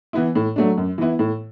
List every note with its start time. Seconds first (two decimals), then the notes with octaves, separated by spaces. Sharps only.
0.13 E3 B3 E4
0.35 A2
0.56 F#3 A3 D4
0.78 F#2
0.98 E3 B3 E4
1.19 A2